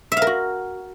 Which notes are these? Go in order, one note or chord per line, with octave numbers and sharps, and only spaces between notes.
E5
F5
A#4
F#4